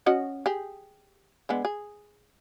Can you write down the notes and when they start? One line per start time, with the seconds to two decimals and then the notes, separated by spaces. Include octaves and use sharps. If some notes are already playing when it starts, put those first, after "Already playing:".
0.06 C#4 F#4 D#5
0.46 G4 G#4
1.49 D3 G#3 B3
1.65 G#4